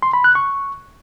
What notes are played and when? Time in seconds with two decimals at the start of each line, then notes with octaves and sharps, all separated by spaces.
0.03 C6
0.13 B5
0.24 F#6
0.35 C#6